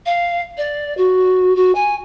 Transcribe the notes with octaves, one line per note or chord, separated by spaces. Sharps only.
F5
D5
F#4
F#4
G#5